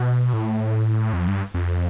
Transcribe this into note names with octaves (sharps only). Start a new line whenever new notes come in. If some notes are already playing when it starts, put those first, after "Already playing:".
Already playing: B2
A2
F2
G2
F2